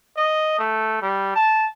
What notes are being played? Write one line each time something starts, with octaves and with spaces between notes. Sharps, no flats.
D#5
A3
G3
A5